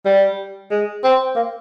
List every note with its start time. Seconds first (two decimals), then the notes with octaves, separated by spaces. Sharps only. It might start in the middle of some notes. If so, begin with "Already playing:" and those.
0.06 G3
0.71 G#3
1.04 C4
1.36 A#3